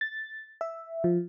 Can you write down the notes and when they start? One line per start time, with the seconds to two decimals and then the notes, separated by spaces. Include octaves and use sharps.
0.01 A6
0.61 E5
1.04 F3